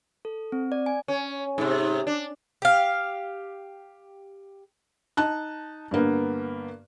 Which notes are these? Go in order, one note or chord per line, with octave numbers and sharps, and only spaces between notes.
A4
C4
D5
G#5
C#4
G#2 C3
D4
G4 F5
D#4 A5 F#6
G2 D3 A#3 B3